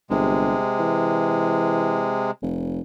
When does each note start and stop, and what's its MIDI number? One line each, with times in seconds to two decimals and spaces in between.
0.10 0.57 31
0.10 2.31 48
0.10 2.31 56
0.79 2.20 52
2.42 2.80 29